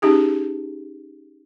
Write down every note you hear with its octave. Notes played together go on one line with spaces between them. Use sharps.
C#4 D#4 G4 G#4